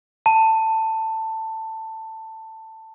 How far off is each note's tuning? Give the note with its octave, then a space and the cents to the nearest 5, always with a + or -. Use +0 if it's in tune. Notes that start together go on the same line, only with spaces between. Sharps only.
A5 +15